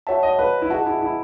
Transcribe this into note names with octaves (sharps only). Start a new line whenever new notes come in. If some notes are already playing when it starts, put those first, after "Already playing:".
F#4 C#5 E5 F#5 A5
D#5
B4
E4
F#4 G#4 D#5 F#5 A5
E4
E4